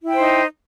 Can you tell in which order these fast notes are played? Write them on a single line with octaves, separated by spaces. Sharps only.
E4 G5 C5 D#4